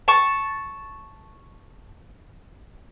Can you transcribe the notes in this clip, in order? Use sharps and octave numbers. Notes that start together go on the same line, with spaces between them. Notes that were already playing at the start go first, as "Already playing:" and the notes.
A5 C#6